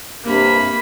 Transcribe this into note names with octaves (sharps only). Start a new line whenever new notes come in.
G2 C3 A#3 B5